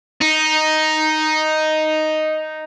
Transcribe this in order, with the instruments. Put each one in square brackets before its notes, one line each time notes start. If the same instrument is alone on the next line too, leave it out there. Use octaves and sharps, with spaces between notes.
[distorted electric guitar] D#4